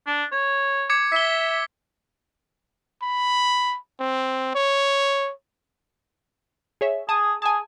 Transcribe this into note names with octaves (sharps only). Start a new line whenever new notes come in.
D4
C#5
D6 G#6 C#7
E5 B6 G7
B5
C4
C#5
G#4 C#5 E5
G#4 A5 D#6
G#4 G#5 A5